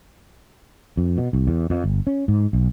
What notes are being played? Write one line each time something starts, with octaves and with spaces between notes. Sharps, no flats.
F2
B2
C2
E2
F2
G1
C#4
G#2
B1